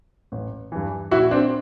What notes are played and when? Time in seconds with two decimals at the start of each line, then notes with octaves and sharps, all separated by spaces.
0.32 A1
0.72 G2 E3
1.11 A#1 E4 F#4
1.31 C4 D4